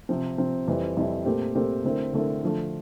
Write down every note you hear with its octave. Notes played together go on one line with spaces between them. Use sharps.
C3 F3 C4
C3 F3 C4
F2 E3 G3 C4 E4
F2 E3 G3 C4 E4
A#2 A3 C4 G4 A#4
A#2 A3 C4 G4 A#4
D3 A3 C4 E4 A#4
D3 A3 C4 E4 A#4
D3 F3 A3